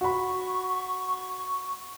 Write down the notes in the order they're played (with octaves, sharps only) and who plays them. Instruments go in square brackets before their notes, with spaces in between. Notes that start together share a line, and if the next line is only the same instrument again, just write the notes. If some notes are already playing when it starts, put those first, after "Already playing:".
[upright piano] F#4 B5 [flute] C#6